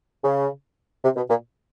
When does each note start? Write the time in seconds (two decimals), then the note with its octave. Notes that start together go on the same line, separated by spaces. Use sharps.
0.24 C#3
1.04 C3
1.16 B2
1.30 A#2